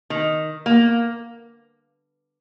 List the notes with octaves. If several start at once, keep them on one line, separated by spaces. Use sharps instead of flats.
D#3
A#3